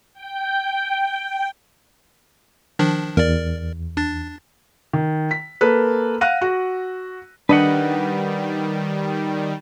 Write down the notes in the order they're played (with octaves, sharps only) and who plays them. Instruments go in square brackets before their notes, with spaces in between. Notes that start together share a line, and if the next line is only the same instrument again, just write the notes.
[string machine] G5
[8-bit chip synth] D#3 F3 D4
[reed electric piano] E2 [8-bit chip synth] A#4 D5
[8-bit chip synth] D4 A6
[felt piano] D#3
B6
A#3 A4 B4
F5 F#5 F#6 A#6 D#7
F#4
[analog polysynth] D#3 G3 [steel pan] D4 [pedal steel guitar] B4 D#5 F#5